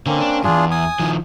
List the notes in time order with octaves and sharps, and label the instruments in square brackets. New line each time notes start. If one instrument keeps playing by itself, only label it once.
[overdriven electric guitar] D3 [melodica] A#3 C4 C#4
[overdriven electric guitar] D4
[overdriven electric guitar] E2 G2 [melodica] D4 F4 G#4
[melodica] G#5 D#6
[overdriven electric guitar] D#3 F3